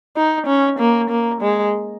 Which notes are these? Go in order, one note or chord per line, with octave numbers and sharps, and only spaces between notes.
D#4
C#4
A#3
A#3
G#3